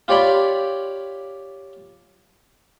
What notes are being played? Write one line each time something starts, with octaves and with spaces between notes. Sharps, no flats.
F4 G4 C#5 D5 B5